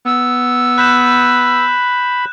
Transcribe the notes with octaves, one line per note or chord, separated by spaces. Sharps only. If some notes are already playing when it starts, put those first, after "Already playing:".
B3 E6
B5 F#6 G6 E7